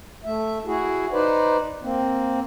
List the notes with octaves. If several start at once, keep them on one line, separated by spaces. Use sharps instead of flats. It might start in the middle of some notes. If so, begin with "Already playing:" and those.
A3 E5
E4 F#4 G#4
D#4 B4 C5 D5
A#3 C4